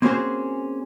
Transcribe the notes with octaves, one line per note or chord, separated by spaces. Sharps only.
A#3 C4 C#4 F#4 G#4 C5